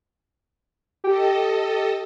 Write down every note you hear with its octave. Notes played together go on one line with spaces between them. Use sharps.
G4 A4 D#5 G5